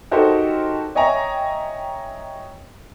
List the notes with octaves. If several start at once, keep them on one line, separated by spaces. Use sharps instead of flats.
D#4 F#4 G4 A4 A#4 C5
C#5 D#5 E5 G5 G#5 A#5